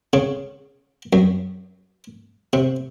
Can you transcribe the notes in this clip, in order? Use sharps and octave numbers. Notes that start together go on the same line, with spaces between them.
C#3
F#2
C3